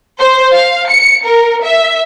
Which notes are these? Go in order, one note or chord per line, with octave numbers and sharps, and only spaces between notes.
C5
F5
C#7
A#4
E5